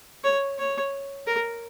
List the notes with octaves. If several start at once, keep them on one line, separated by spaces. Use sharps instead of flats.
C#5
C#5
A#4